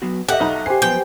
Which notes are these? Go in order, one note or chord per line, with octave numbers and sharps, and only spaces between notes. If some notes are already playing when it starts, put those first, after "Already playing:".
F#3 B3 F#4
G4 A4 D#5 E5 F#5
B1 D#4 A#5
G4 C5 G#5 C7
F#2 F3 B3 G5